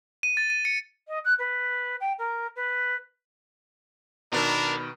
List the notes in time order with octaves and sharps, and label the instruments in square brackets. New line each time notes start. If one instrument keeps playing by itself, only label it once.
[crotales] D#7
A6
D#7
C#7
[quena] D#5
F#6
B4
G5
A#4
B4
[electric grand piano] B2 D#3 [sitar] B3 [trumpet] D4 [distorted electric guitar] A#4